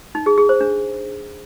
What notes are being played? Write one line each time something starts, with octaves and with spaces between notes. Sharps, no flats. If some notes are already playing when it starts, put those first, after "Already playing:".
D#4
G#4
G#4
C5
D4